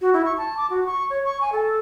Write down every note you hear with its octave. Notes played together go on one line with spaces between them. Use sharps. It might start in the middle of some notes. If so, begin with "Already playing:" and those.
F#4
E4
C#6
A5
D6
F#4
C#6
C#5
C#6
G#5
A4